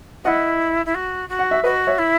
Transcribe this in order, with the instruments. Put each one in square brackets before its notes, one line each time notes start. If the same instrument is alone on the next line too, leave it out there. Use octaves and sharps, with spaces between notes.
[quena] E4 F#4 [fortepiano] D#5 F#5
[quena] E4
F#4
F#4
[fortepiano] F#5
E5
[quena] F#4 [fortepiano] B4 D#5
[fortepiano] C#5 E5
[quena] E4